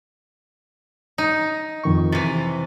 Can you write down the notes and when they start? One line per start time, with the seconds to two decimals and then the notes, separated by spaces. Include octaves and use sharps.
1.18 D#4
1.84 F2 D#3 C#6
2.12 C3 E3 A6